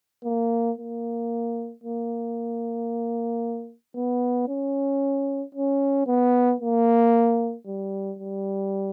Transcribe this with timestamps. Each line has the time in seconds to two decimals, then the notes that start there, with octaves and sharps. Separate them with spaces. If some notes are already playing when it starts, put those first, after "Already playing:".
0.24 A#3
0.78 A#3
1.83 A#3
3.96 B3
4.48 C#4
5.55 C#4
6.07 B3
6.60 A#3
7.66 G3
8.19 G3